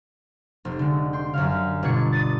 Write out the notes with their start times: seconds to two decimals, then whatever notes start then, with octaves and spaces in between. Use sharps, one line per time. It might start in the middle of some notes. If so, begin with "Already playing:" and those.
0.65 F1
0.79 D3 G#3
1.13 G5 C6
1.33 F#2 D3 F5
1.83 G1 B2 D4 G#6 C#7
2.12 D#6 A6